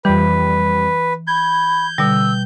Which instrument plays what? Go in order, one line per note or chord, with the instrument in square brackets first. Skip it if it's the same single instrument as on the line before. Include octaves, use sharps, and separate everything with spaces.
[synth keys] F2 G3 [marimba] E3 [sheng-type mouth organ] B4
[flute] B5 [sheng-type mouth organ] G6 [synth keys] G#6
[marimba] B2 G3 [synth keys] D3 [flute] E6